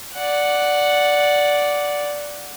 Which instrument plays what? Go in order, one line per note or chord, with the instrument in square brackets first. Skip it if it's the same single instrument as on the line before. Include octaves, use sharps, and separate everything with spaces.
[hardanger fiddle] D5 F#5